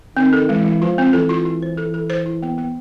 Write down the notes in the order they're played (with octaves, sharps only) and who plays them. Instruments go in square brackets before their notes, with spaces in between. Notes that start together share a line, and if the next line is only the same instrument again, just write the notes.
[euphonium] D#3 [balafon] C4
[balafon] A4
[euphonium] E3 [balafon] G#3
[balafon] G#3
[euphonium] F3 [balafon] F4
[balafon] C4
[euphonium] E3 [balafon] A4
[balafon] F4
E4
C5
A4
A4
C5
E4
B3
B3